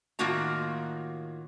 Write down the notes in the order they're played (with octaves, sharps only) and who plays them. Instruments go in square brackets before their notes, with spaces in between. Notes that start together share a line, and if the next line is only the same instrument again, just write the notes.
[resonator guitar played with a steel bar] A2 D#3 A#3 F4 F#4 A#5